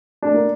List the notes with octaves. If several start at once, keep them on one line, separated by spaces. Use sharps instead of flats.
A3 D4
A#3